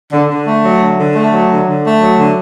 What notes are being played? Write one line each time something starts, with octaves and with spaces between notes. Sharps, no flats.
D3
D3
A3
F#3
D3
D3
A3
F#3
D3
D3
A3
F#3
D3